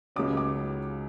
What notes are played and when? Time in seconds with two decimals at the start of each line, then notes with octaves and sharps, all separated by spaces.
0.16 C#2 C#3 F#3 C#4 D6
0.37 D6